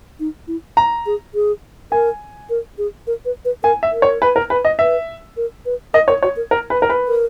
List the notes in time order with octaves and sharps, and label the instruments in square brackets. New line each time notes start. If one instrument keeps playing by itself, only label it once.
[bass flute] D#4
E4
[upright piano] A#5
[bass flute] G#4
G#4
[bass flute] A#4 [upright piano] G#5
[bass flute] A#4
G#4
A#4
B4
B4
[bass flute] A#4 [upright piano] G#5
[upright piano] E5
[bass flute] A#4
[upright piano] C#5
B4
A#4
B4
D#5
[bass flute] B4 [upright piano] E5
[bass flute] A#4
B4
[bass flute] A#4 [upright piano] D#5
[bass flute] A#4 [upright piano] C#5
[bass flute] F#4 [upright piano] C#5
[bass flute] A#4
[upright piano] A#4
B4
A#4
B4
[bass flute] A#4